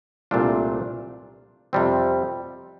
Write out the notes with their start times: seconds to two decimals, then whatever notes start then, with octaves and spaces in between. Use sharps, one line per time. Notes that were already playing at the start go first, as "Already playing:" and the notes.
0.31 C2 A#2 A3 D4 F4
1.73 F2 C3 G3 C4